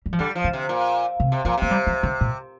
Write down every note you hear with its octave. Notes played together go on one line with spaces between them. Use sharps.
G3
F3
D3 G3
F3
D3
C3
A#2
C3
C3
A#2 F3
C3 A#3
G3
F3
D3
A#2